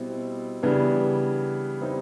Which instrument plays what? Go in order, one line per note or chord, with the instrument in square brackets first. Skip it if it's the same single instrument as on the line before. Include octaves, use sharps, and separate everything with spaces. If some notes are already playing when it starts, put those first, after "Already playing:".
Already playing: [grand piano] B2 G3 C4 E4
C#3 E3 G3 B3 D4
E3 G3 C4 D#4